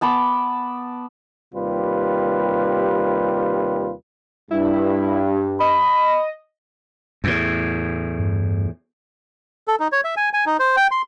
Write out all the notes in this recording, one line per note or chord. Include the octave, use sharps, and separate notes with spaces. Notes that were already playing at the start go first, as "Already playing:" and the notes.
B3 A5 B5 D6
D#2 C3 G3 F4 G4 B4
G2 E4
D#5 B5
E2 A2
G2
A4
D#4
C#5
E5
G#5
G#5
D#4
C5
G5
C6